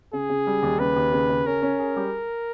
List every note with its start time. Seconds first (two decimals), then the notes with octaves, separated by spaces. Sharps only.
0.13 C#3 G#4
0.30 C#3
0.47 G3
0.63 D#2
0.79 C#3 B4
0.96 D#2
1.13 C#3
1.29 C#3
1.46 C#4 A#4
1.62 C#4
1.79 G#4
1.96 G3